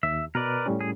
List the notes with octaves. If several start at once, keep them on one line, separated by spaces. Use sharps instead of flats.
D#2 E5
B2 A#4 B4 D5
A2 G3 C#4
G#4